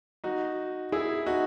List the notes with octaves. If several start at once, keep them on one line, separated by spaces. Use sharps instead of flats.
D#4 F#4
E4 G#4
D#4 F#4